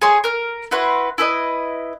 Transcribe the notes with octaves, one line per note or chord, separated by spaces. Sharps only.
G#4 C#5 C6
A#4 F6
E4 F#4 B4 C6
E4 A4 B4 D#5